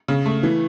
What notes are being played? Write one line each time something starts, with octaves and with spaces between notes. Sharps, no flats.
C#3
A3
E3